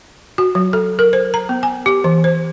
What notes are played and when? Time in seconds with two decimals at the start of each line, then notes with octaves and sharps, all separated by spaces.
0.38 F#4
0.55 F#3
0.73 A4
0.99 A#4
1.13 C5
1.34 A#5
1.49 B3
1.63 G#5
1.86 G4
2.04 E3
2.24 C5